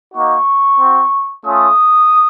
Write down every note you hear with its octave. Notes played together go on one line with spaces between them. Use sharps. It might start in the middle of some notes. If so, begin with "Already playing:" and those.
A#3 D#4 F#4 C#6
C4 F#4
A3 C#4 F4 D#6